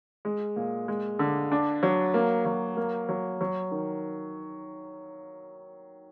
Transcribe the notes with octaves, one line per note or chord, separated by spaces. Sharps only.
G#3
A#2
G#3
D3
D4
F#3
A#3
F#3
A#3
F#3
F#3
D#3